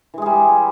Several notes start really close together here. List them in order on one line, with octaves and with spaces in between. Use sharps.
E3 G#3 G#4 G3